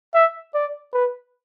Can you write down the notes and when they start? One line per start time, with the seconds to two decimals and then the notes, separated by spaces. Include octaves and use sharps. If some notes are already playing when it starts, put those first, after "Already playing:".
0.14 E5
0.54 D5
0.93 B4